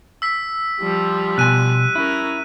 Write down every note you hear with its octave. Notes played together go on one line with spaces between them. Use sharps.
E6 B6
F3 G3
B2 G#5 F#6 D#7
C#4 E4 A#4